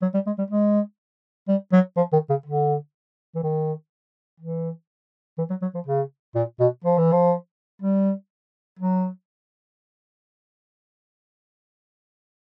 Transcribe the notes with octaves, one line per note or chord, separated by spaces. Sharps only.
F#3
G3
G#3
G3
G#3
G3
F#3
F3
D#3
C#3
D3
E3
D#3
E3
E3
F#3
F#3
F3
C#3
A#2
B2
F3
E3
F3
G3
F#3